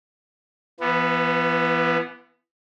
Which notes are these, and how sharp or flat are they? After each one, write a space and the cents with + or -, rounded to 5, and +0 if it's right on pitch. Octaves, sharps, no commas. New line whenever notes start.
E3 +40 B3 +0